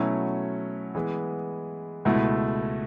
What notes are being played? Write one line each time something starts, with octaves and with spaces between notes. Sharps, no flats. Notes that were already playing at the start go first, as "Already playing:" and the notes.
Already playing: B2 F#3 A3 C#4 E4
E3 G#3 B3
C#2 B2 A3 E4